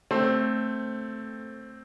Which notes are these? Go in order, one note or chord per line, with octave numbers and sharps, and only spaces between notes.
A3 C4